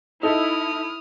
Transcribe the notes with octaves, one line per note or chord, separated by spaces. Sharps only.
D#4 E4 A4 D#5 D#6 F6